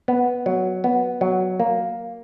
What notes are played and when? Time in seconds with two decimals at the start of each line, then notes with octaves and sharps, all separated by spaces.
0.08 B3
0.46 F#3
0.84 B3
1.21 F#3
1.60 A#3